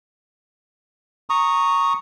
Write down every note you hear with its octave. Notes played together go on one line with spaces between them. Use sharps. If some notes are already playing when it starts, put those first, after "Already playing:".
A#5 C#6 D#6